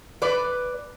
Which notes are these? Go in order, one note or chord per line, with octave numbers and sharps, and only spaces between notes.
B4 D5